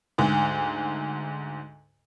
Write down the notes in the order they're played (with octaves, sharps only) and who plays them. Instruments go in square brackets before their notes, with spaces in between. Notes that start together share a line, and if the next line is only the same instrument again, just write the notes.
[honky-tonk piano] D2 G#2